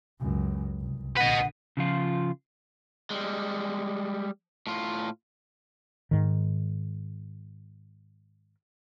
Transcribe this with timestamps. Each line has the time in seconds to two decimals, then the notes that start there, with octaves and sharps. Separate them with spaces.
0.20 C#2 F#2
0.80 C2
1.17 A#1 D3 B4 D#5 F#5
1.77 C#3 F3 F4
3.10 G3 G#3
4.67 A2 F4
6.11 G#2 D#3